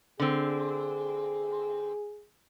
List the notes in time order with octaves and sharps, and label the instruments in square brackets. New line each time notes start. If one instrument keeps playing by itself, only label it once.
[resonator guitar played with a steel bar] D3 C4 [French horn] G#4